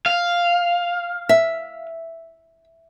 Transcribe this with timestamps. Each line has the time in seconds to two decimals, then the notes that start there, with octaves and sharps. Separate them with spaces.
0.06 F5
1.29 E5